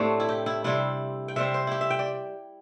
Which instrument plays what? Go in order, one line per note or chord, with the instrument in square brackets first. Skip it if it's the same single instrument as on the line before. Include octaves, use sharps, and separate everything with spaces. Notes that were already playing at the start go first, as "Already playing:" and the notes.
Already playing: [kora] A2 A3 C4 D4 G4
E4
G4
E4
C3 G3 C4 E4
G5
C3 G3 C4 E5
C5
E4 G4
E5
G5
D5